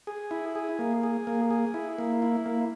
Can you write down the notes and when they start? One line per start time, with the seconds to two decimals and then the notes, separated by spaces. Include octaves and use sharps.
0.07 G#4
0.31 E4
0.55 G#4
0.79 A#3
1.03 G#4
1.27 A#3
1.50 G#4
1.74 E4
1.98 A#3
2.22 E4
2.46 A#3